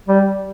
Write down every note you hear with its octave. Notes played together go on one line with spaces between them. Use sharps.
G3